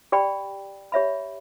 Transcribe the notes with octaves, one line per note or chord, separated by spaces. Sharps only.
G4 D5 G5 B5
G4 C#5 E5 B5